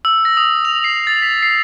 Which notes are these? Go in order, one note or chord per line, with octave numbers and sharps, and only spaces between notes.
E6
A#6
D#6
F7
C7
A6
B6
C7